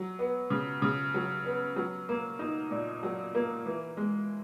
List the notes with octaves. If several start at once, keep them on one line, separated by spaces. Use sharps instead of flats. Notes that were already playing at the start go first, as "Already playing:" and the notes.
Already playing: F#3
B3
C#3
C#3
F#3
B3
F#3
A#3
D#4
A#2
F#3
A#3
E3
G#3